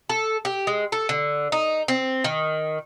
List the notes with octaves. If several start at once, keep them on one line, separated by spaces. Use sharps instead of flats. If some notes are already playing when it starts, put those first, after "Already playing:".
A4
G4
G#3
A4
D3
D#4
C4
D#3